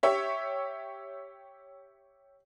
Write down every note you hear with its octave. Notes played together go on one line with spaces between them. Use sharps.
G4 C#5 E5